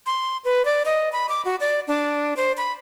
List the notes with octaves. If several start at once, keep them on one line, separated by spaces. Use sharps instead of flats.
C6
B4
D5
D#5
B5
D6
F#4
D5
D4
C5
B5